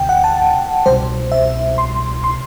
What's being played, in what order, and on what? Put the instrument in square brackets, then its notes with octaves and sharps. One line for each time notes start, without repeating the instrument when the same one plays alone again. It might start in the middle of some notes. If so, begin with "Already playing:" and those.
Already playing: [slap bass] D2 C3 [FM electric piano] G5
[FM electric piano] F#5
A5
[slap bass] C2 B2 G3 [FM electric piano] C5
[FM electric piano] E5
C6
C6